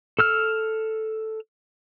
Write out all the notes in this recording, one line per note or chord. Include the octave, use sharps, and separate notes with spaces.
A4 E6 F6